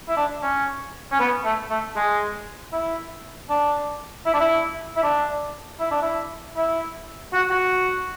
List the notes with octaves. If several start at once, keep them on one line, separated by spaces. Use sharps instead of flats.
E4
D4
C#4
C#4
B3
A3
A3
G#3
E4
D4
E4
D4
E4
E4
D4
E4
D4
E4
E4
F#4
F#4